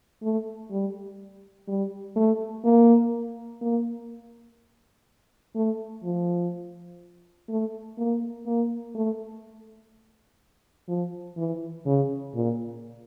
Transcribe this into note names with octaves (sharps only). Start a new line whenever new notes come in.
A3
G3
G3
A3
A#3
A#3
A3
F3
A3
A#3
A#3
A3
F3
E3
C#3
A#2